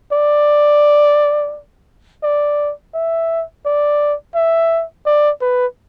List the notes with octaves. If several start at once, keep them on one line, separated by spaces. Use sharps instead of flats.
D5
D5
E5
D5
E5
D5
B4